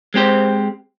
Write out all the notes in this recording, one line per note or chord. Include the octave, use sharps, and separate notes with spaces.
G#3 C4 G4 C5